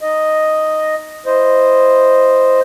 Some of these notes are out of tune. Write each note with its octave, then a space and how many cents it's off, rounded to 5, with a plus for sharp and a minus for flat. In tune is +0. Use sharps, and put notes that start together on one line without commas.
D#4 +0 D#5 +0
E4 +0 C5 +0 D#5 -5